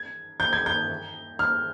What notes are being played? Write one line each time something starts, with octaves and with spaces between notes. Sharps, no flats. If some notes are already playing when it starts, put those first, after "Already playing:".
Already playing: G#6
G6
G#6
G6
F6